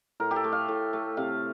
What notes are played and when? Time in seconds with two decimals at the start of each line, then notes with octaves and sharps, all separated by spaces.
0.20 A2 A#4
0.31 G4
0.36 A4
0.44 A3
0.52 F5
0.68 A2
0.93 A3
1.17 C3 F5